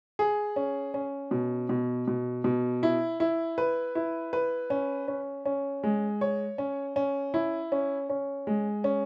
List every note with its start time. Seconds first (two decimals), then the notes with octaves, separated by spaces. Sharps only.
0.19 G#4
0.56 C#4
0.94 C#4
1.31 B2
1.69 B2
2.08 B2
2.44 B2
2.83 E4
3.20 E4
3.58 B4
3.95 E4
4.33 B4
4.70 C#4
5.08 C#4
5.45 C#4
5.83 G#3
6.21 C#5
6.58 C#4
6.96 C#4
7.34 E4
7.72 C#4
8.09 C#4
8.47 G#3
8.84 C#4